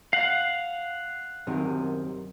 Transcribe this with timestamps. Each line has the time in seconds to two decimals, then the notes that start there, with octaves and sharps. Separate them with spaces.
0.13 F5 F#5
1.47 F#2 C3 D#3